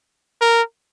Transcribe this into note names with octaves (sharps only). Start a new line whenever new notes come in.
A#4